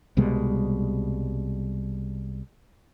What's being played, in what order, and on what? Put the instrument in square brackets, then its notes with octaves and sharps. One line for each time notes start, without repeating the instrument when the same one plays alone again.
[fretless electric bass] C2 B2 G3 G#3